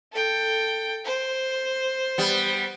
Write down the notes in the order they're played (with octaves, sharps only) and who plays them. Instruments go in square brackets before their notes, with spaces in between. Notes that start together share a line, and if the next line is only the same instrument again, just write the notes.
[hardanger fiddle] A4 G5
C5
[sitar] G3 B3